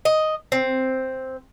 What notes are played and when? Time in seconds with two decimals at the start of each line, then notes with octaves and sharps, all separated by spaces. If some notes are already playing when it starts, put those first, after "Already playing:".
0.05 D#5
0.52 C4